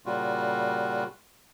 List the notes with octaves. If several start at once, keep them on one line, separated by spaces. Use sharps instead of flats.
A#2 C#3 G3 F4 F#4